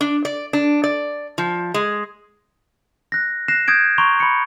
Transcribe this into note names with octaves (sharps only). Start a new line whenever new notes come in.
D4
D5
D4
D5
F3
G#3
F#6 A#6
F#6 A#6 C7 E7
D#6 G6 G#6 D7
A#5 C6 C#6 D7 F7 G7
B5 C#7